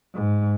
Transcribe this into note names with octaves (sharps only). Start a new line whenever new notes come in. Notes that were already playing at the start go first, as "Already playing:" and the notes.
G#2